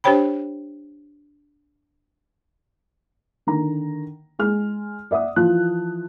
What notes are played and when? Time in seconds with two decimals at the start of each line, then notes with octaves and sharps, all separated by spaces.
0.04 D4 G4 C5 C#5 G5 B5
3.47 D3 D#3 A#5
4.39 G#3 G#4 F6
5.11 D5 E5 F#5 D#6
5.36 E3 F3 F4 A5 F#6